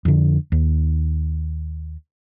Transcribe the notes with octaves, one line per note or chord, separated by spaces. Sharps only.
F2 D3
D#2